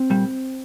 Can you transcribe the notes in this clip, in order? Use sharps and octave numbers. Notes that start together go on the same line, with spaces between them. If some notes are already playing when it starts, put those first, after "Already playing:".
Already playing: C4
A#2 G3